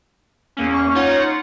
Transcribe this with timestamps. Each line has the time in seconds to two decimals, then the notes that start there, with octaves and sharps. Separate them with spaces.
0.57 E2 A#3 C#4
0.73 C#6
0.95 D#4 F4 C#5 F#5